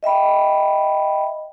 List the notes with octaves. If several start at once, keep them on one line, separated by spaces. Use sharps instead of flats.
D#5 E5 G5 B5